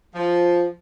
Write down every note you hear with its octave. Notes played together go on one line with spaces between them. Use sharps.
F3